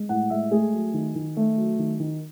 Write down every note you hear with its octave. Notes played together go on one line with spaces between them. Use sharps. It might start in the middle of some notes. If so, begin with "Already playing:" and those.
Already playing: G#3
A2 F#5
G#3 E5
A3 G#4
F#3
D#3
D#3
A3
F#3
D#3
D#3